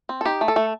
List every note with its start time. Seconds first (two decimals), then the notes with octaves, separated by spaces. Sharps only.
0.09 C4
0.21 A4
0.25 D#4 G4
0.41 A3
0.48 A4
0.56 A3